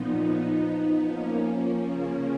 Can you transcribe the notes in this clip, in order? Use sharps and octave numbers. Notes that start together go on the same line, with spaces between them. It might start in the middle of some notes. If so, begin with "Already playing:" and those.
Already playing: A#2 F3 B3 D#4
F3 B3 D#4
F3 A#3 C#4
C#3 F3 A#3 C#4